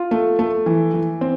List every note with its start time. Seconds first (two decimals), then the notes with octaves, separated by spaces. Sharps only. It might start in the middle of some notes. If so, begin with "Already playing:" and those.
Already playing: F4
0.11 A3
0.39 A3
0.66 E3
0.94 E3
1.21 C4